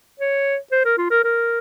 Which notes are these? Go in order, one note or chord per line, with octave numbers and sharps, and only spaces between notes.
C#5
C5
A#4
F4
A#4
A#4